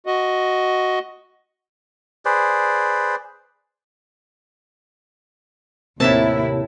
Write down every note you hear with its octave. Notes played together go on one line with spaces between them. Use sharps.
F#4 D#5
G#4 B4 C5 D5
D#2 A2 C3 A#3 E4 E5 A5 E6